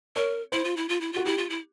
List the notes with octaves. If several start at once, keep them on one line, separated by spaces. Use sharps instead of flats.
A#4 C#5
E4 C5
F4
E4
F4
E4
F4 F#4
E4 G4
F4
E4